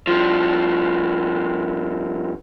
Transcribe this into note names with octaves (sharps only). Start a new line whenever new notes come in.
G2 F3